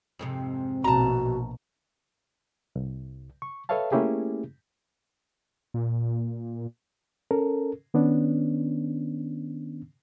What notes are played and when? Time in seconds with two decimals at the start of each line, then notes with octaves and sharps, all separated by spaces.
0.19 F2 G#2 C3
0.84 A#1 B2 F#4 A5 A#5
2.76 C2
3.42 C#6
3.69 A4 B4 C#5 E5 F5 A5
3.92 A3 A#3 C#4 E4 G4 G#4
5.74 A#2
7.31 C#4 A4 A#4
7.94 D#3 B3 C#4 D4